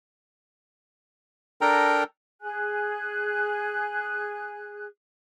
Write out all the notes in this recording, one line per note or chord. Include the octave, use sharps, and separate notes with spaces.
D4 A4 A#4 G5 A#5
G#4 G#5 F#6